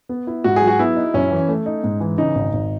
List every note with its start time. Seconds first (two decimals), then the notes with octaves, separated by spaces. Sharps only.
0.09 B3
0.27 E4
0.44 G#2 F#4
0.56 G#4
0.62 F#3
0.67 F#4
0.79 B3 E4
0.96 D#4
1.14 F#2 C#4
1.31 E3
1.48 A3
1.66 D#4
1.84 G#2
2.00 E3
2.18 C#3 D#4
2.35 G#1
2.53 G#1